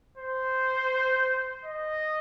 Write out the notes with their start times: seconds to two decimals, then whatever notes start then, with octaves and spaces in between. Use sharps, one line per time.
0.18 C5
1.65 D#5